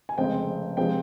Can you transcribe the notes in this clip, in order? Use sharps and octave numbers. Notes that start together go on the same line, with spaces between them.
G#5
F1 F2 C#3 G#3 C4 G5
C3 F3 G#3 C4 G5